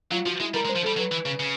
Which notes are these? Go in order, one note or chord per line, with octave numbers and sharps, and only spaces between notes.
F#3 F4
F3 F#4
G#3 E4
G3 A#4
G#3
C5
F3
G3 A4
F#3 B4
E3
C#3
C#3